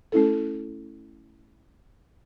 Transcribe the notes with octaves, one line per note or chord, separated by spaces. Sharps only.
A3 C#4 E4 A4